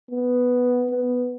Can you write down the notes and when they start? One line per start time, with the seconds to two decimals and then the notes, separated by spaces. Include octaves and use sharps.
0.11 B3
0.90 B3